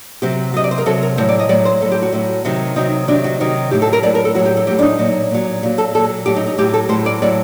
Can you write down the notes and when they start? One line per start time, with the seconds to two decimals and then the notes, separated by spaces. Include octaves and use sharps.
0.22 C3 F#3 G4
0.54 C3 F#3 D#5
0.64 D5
0.71 C5
0.78 A#4
0.86 C3 F#3 A4
1.03 A#4
1.17 A2 F#3 C5
1.29 D5
1.39 D#5
1.49 A2 F#3 D5
1.65 C5
1.81 A2 A4
1.85 F#3
1.92 G4
2.02 F#4
2.13 A2 F#3
2.45 C3 D#3 F#3
2.76 C3 D#3 F#3 D#4
3.08 C3 D#3 F#3 D4
3.24 F#4
3.40 C3 D#3 F#3
3.71 A2 F#3 G4
3.82 A4
3.93 A#4
4.03 A2 F#3 D5
4.15 A#4
4.25 A4
4.35 A2 F#3 F#4
4.45 G4
4.57 A4
4.67 A2 F#3 G4
4.79 D4
4.83 D#4
4.99 A#2 F#3
5.31 A#2 F#3
5.63 A#2 F#3
5.78 A4
5.95 A#2 F#3 A4
6.26 A2 F#3 G4
6.36 D#4
6.47 D#4
6.58 A2 F#3 G4
6.74 A4
6.89 A2 C5
6.92 F#3
7.06 D5
7.22 A2 F#3 D5